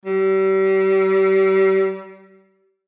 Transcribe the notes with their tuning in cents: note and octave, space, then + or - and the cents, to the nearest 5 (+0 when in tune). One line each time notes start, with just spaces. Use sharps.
G3 -35